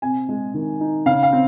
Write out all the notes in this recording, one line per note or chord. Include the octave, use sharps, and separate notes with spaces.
C3 G#5
G#3
D#3
D#4
C#3 F5
F5
C4